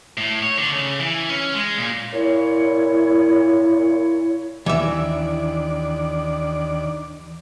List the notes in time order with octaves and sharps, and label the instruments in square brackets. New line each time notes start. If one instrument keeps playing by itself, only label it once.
[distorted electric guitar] A2
C#5
D3
C#3
E3
C#4
G#3
A#2
[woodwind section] A#2 C#5 [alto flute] E4
[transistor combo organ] D#2 D4 D5 [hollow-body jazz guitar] E3 E5